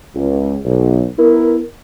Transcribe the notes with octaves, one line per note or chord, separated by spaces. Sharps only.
C#2
B1
B3 E4 A#4